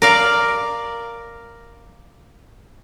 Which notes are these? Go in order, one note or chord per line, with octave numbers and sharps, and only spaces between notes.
A#4 D5 F5